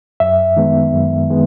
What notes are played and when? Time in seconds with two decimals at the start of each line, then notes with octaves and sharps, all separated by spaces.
0.20 F#2 E5
0.57 D#3 G#3 B3
0.93 F#2
1.30 D#3 G#3 B3